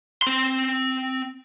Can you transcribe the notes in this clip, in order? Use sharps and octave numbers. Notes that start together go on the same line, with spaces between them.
C4 C6